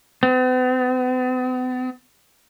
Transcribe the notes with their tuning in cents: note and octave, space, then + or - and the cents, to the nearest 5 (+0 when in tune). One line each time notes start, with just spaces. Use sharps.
B3 +45